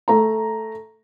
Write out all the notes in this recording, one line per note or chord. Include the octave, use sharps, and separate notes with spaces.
A3 A#5